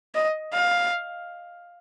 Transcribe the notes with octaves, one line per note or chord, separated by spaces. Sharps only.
D#5
F5